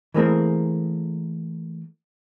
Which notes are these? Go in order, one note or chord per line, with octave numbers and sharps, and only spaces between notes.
E3 A3 A#3 C4 G#4 A#4